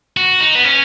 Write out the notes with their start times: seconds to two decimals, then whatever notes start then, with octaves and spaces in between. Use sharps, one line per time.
0.17 F#4
0.40 D#4
0.55 B3
0.64 C#4